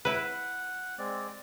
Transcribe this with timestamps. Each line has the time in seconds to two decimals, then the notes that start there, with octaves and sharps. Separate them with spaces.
0.05 E4 B4 F#5
0.98 G#3 C4 D5